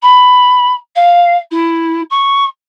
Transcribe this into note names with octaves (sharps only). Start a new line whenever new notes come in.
B5
F5
E4
C#6